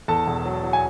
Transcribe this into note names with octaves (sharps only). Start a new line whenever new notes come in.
E2 A4 A5
E1
F#3
F#3
G#5